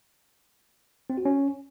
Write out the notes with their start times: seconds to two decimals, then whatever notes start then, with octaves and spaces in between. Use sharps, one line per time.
1.10 C4
1.18 F#4
1.25 C#4